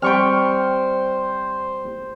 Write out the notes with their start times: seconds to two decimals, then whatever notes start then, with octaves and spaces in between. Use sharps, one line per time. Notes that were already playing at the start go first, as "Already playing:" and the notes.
0.02 G3 C4 C5 G5 C#6 F6